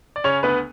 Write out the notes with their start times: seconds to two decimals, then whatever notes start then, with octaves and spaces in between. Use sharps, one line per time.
0.16 D5
0.24 C#3 C#4 C#5
0.43 D2 B3 B4